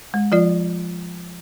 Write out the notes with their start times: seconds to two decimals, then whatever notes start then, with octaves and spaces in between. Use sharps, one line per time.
0.14 G#3
0.32 F3 F4 D5